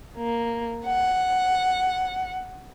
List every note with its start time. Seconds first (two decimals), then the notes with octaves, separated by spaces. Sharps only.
0.17 A#3
0.86 F#5